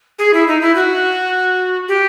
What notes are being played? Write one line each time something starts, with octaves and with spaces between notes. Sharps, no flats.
G#4
E4
D#4
E4
F#4
G4